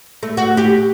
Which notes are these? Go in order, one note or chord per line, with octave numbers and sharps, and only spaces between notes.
A3
F#4
G4